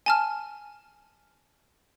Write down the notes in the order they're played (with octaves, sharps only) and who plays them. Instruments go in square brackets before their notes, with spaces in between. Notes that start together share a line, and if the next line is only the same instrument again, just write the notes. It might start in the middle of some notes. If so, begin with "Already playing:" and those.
[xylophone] G#5 A5 F6